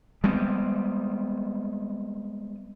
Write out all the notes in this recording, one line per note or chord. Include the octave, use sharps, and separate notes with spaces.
G3 G#3 B3 C4